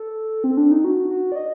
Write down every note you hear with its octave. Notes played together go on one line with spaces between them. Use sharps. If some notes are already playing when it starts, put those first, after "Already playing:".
Already playing: A4
C4
D4
D#4
F#4
F#4
D5
D#5